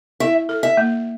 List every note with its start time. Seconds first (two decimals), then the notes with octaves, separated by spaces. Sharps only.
0.20 E4 E5
0.49 A4
0.63 E5
0.77 A#3